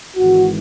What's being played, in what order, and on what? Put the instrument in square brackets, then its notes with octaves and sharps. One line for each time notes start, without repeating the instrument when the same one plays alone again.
[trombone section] G#1 G#2 E3 G#3 F#4